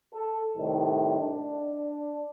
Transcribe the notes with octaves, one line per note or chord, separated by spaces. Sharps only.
A4
C2 A2 D#3
D4